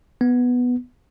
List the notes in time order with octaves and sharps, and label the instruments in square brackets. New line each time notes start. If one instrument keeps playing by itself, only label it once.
[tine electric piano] B3